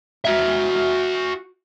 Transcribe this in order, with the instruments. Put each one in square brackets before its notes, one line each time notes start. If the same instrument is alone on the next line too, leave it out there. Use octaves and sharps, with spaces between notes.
[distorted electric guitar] F#4 E5